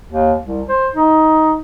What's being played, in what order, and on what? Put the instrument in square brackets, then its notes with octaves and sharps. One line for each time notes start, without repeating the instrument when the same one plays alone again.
[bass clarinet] D#2
C2
C5
D#4